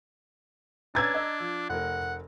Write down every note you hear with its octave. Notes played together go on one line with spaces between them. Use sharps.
C#4 D4 B4 A#5 E6 G#6 A6
D#5 A#5
F3
F1 A#4 F#5